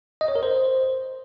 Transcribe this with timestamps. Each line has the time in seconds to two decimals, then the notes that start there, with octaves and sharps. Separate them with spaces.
0.21 D#5
0.28 C#5
0.36 A#4
0.43 C5